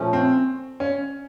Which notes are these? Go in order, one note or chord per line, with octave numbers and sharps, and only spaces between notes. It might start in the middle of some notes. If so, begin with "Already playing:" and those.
Already playing: A#2 F3 A3 C#4
C4
C#4